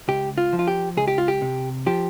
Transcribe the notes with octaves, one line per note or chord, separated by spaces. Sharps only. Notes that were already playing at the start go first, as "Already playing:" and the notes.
C#2 G4
F4
F3
F4
G4
C#2 G#4
G4
F4
G4
C3
F3 G4